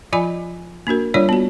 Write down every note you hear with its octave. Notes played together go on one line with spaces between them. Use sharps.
F3 F4 D5 G#5 B5
A#3 D4 F#4 A#4
G3 D4 F4 C#5 D5
B3 F#4